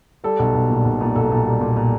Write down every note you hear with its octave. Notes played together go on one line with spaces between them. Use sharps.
G3 A4
B1
B1
A#2
B1
A#2
B1 A4
A#2
G3
A#2
A#2